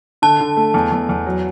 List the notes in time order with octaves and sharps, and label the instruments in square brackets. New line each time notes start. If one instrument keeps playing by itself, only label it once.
[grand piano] D3 [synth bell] A5
[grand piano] D3
A3
E2
E2
E2
F#3